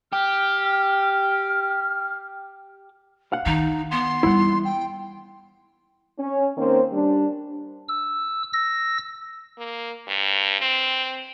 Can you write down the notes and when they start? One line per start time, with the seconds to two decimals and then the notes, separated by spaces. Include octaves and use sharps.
0.13 G4 F6
3.32 F5 F#5
3.46 D#3 D#4
3.91 B3 C6
4.23 E3 G3 E4 F#5
4.65 G5
6.18 C#4
6.57 D#3 A#3 C4 C#4 A#4 C5
6.91 G3 D4
7.88 E6
8.53 E6 A#6
9.58 A#3
10.08 G2
10.61 C4